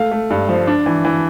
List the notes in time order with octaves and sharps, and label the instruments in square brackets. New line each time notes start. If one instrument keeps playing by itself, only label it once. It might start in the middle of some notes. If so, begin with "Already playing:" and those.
Already playing: [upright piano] A3 F5
A3
G2
F3
D4
E3
E3